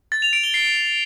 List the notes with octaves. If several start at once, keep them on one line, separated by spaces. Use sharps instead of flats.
A6
F7
D7
G7
C7